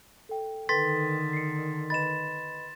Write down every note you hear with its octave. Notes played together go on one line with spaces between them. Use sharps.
A4 G5
D3 D#3 A4 B4 G5 C6 A6 B6
C7 C#7
B4 D#5 B5 A6 E7